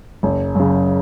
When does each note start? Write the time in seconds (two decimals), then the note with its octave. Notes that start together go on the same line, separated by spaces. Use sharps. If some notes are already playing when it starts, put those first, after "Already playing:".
0.23 F#1
0.55 F#2 C#3